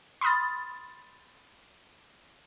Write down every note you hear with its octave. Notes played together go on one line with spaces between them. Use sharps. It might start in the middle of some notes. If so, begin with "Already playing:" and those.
B5 C6 D#6 F6 A6